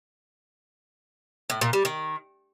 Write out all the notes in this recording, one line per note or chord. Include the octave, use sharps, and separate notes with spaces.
A2
A#2
G3
D#3